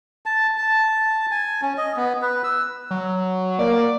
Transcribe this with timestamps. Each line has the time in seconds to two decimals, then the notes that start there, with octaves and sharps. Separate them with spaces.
0.26 A5
0.58 A5
1.31 G#5
1.62 C#4
1.78 D#5
1.97 B3
2.22 B4
2.44 E6
2.91 F#3
3.59 A#3 D5